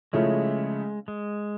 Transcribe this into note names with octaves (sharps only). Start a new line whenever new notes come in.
C#3 F3 G#3 A3 C#4 E4
G#3